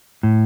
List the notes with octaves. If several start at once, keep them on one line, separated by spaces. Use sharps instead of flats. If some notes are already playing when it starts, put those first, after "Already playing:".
A2